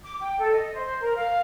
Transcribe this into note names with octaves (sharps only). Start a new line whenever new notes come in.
D6
G5
A4
D#5
C5
A#4
F5